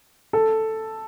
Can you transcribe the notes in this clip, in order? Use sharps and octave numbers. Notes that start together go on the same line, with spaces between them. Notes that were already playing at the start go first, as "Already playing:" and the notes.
A4